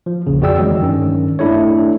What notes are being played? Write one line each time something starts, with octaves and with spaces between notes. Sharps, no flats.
F3
A#1 D#2 C#3
F2 F#4 G#4 D5 G5 E6
D#3 E3 F#3 G#3
G2 D#3 C#4
A3 D4 E4 A4 C#5